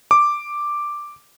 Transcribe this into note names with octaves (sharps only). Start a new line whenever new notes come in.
D6